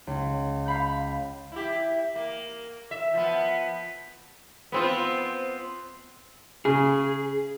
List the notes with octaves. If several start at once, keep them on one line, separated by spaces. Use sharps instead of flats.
C#2
F5 B5 G6
E4 G4
A#3
E5
F3 B3
B3 C4 F4
C#3 G#4